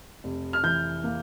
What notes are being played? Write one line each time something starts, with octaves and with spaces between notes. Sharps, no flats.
F1
F6
E3 G6
A#3